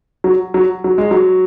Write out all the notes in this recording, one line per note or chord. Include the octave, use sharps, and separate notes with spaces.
F#3
F#3
F#3
G#3
F#3